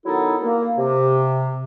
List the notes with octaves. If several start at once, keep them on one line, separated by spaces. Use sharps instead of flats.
D#3 F#3 B3 D#4 E4 A4
A#3
C3